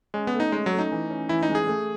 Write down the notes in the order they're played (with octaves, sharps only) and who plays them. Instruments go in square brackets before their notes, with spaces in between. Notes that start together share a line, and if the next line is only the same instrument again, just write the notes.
[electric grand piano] G#3 [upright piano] C#4
[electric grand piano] B3
[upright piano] A3
[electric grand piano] D#4
[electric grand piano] G#3 [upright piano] C#4
[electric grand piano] F#3
[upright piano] A3
[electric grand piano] D#4
[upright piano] E3
C#4
[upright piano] E3 [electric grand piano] E4
[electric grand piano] D#4
[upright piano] G#3
[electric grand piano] G#4
[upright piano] A3